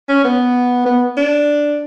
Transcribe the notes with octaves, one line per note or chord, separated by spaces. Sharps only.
C#4
B3
B3
D4